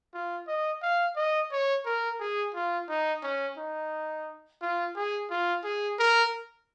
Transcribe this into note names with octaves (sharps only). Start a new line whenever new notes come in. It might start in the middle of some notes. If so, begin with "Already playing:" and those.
F4
D#5
F5
D#5
C#5
A#4
G#4
F4
D#4
C#4
D#4
F4
G#4
F4
G#4
A#4